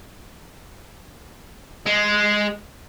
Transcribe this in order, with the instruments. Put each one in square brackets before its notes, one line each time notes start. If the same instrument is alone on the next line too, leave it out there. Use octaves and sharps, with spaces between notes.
[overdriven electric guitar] G#3